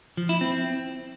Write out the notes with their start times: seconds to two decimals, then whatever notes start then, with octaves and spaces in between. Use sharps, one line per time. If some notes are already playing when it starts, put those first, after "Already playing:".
0.17 F3
0.29 E4
0.41 C4